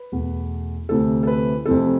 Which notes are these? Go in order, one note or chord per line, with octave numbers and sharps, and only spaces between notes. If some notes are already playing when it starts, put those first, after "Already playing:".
Already playing: B4
E2 B2 A3
D2 C3 E3 A3 A4
A4
B4
F2 C3 E3 A3 A4